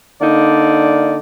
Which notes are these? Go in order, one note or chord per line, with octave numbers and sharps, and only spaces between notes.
D3 A#3 D#4 D5